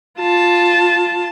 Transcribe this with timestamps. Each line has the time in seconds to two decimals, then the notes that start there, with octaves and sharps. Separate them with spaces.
0.19 F4 A5